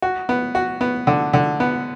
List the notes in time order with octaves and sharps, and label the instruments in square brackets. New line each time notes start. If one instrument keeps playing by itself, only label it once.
[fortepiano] F#4
B3
F#4
B3
D3
D3
B3